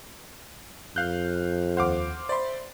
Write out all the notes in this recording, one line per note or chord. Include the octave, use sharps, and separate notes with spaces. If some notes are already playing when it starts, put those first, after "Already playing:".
F2 F5 F#6 G6
D#2 C5 F5 F#5 D6
C5 D5 E5 B5 C6